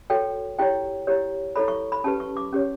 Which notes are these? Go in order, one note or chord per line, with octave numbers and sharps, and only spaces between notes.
F#4 A4 C#5 G5
E4 G4 C#5 G5
E4 G4 C#5
E4 A4 C#5 B5
C#6
B5
C#4 G4 B4 A5
C#6
D6
C#4 G4 C#5